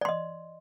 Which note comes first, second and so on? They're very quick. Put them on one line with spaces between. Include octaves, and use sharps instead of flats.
D5 C6 D#5